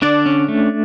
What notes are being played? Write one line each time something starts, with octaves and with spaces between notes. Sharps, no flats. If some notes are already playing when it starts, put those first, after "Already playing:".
D3 D4 D5
C#4
A3